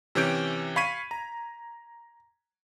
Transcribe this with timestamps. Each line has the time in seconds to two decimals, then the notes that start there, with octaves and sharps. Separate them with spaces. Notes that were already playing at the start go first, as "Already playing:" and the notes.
0.15 C3 E3 C#4 G4 G6 D7
0.76 F5 B5 C#6 G#6 B6 D#7
1.11 A#5